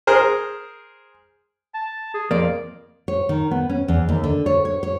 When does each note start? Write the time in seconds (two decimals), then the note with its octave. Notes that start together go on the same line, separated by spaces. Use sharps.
0.07 G#4 A#4 C5
1.74 A5
2.14 G#4
2.31 F2 A#3 D5
3.08 C#5
3.29 D#3
3.51 B3
3.69 C#4
3.88 E2
4.09 D#2
4.24 D3
4.46 C#5
4.65 C#5
4.83 C#5